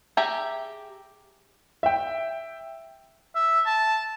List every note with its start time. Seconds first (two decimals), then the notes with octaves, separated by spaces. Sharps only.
0.17 G4 G#4 E5 G5 A#5
1.83 E5 G5
3.35 E5
3.66 A5